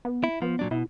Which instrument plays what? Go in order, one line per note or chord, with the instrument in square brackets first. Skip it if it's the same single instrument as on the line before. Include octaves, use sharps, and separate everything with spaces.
[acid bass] B3
[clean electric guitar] E4
[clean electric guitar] F3 [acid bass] B3
[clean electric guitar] A#2 F#3 D4
[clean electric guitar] B2 [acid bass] E4